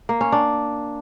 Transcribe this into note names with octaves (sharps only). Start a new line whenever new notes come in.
A#3
C#4
D4